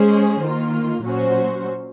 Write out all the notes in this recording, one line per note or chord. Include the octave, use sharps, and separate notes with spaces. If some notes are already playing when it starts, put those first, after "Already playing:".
Already playing: G#3 C#4 G#4 C5
D#3 A#3 F4
A#2 F#3 C#4 F#4 C5